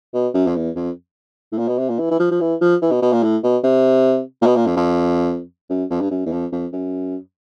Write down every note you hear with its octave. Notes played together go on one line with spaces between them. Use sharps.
B2
F#2
F2
E2
F2
A2
A#2
B2
C3
A#2
E3
E3
F3
F3
E3
F3
E3
B2
B2
A#2
A2
B2
C3
A#2
B2
A#2
F2
F2
F#2
F2
G2
F#2
E2
F2
F2
F#2